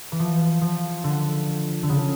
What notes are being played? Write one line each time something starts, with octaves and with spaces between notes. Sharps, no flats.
E3
F3
F3
D3
D3
C#3